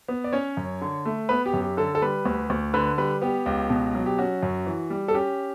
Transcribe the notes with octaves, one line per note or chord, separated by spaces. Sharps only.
B3
D5
C#4 C#5
F#2
D3
A3
B3 B4
G4
F#2
G4
D3 A4
A4
G3 B4
D2
D2
D3 B4
G3 B4
B3 G4
C#2
B2
F#3
G4
C#4 F#4
F#2
E3
G3
A4
C#4 G4